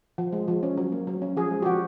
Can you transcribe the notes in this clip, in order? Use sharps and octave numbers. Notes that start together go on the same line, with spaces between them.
F3
G#3
F3
C#4
F#3
A#3
F#3
C#4
F3 G#4
G#3
G4
F3 F#4